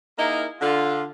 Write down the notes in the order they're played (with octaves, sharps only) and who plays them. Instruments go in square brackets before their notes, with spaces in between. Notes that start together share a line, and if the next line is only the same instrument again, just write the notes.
[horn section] A#3 D#4 E4 G#4 A#4
D3 F4